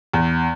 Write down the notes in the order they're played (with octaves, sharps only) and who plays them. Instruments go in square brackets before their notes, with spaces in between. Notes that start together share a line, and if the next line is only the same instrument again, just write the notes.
[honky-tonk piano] E2